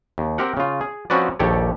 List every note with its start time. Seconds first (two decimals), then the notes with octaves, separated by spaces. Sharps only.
0.18 D#2
0.38 C4 G4 A#4 F#5
0.57 C#3 F4
0.81 G#4
1.10 F3 C4 C#4 F#4 B4 D5
1.39 A#1 D#2 G4 A4 C#5 D5